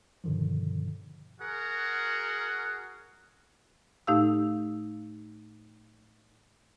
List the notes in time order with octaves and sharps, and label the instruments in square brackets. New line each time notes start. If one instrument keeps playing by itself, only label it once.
[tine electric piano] G2 B2 D3 D#3 F3
[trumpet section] F#4 G#4 A#4 F#5
[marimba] A2 A3 D#4 G4 F5 E6